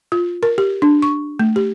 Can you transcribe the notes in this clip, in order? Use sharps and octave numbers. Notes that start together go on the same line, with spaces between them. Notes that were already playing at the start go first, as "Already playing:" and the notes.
F4
A#4
G4
D4
C#6
A3
G4